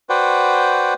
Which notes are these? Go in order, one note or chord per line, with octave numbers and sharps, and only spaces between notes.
F#4 B4 C5 D5 F#5 G5